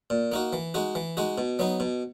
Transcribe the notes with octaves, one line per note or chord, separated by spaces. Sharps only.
A#2
A#3 D#4 F#4
E3
G#3 D#4 F#4
E3
G#3 D#4 F#4
B2
F#3 B3 D#4
B2